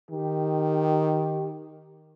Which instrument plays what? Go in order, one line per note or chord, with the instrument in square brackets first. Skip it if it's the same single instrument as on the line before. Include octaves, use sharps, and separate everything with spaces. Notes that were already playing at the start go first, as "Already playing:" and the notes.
[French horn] D#3 [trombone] G4